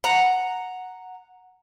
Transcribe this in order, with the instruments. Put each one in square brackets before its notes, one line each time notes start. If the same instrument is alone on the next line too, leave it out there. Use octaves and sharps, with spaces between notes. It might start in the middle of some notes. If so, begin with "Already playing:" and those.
[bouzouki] F#5 A#5